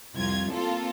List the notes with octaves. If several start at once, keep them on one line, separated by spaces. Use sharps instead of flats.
C2 F2 F4 G#6
A#3 C4 F4 A4